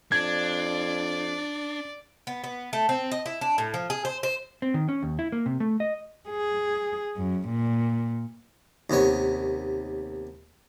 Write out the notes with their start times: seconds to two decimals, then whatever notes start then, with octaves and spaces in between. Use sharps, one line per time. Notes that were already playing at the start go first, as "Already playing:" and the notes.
0.12 F2 D4 D5 G#6
2.27 B3
2.44 B3
2.73 A3
2.89 C4
3.11 D#5
3.26 E4
3.41 D4
3.58 A2
3.74 F3
3.90 G#4
4.05 C5
4.23 C5
4.62 C4
4.74 D#3
4.89 C#4
5.03 D#2
5.19 E4
5.32 A#3
5.46 C3
5.60 A3
5.80 D#5
6.29 G#4
7.17 F#2
7.48 A#2
8.90 D#2 C3 B3 C#5